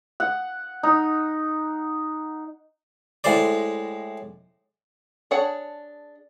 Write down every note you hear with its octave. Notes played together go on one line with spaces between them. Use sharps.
F#5
D#4
A2 G#3 C5 D5
D4 G#4 C#5 F#5 A5